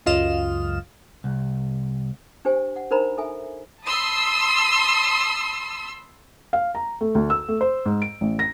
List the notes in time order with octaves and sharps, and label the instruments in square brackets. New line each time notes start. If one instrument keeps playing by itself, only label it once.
[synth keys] C#2 F#2 F4 D#5 F6 E7
[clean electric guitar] C2
[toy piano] D4 G4 C5 G#5
F#5
D4 D#4 A#4 C5 A#5 B5
A4 E5 G#5
[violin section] A5 B5 C6 D#6 E6
[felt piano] F5
A#5
A3
D2
E6
A3
C5
G#2
D7
A1
A#6